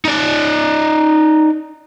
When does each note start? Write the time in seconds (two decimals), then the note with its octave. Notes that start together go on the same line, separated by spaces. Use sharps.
0.05 D#4 D5